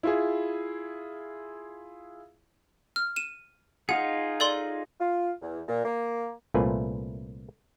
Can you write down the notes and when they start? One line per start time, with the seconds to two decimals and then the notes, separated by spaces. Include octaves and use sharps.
0.03 E4 F4 G#4
2.96 F6
3.16 D#7 E7
3.89 D#4 F4 G#4 F#5
4.40 A4 D5 C6
5.00 F4
5.42 E2
5.68 A#2
5.85 A#3
6.54 C2 A#2 A3 F4 B4 G#5